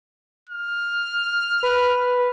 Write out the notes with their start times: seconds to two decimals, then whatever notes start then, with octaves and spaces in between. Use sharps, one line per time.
0.49 F6
1.63 B4